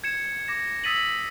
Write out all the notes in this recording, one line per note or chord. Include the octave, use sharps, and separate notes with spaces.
G#6 C#7 E7
D6 A#6 E7
D#6 E6 A6 B6 D#7 F#7